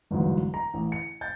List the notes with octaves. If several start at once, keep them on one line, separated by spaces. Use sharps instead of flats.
G1 E2 G#2 F#3
A#5
A1
C#7
G6 A6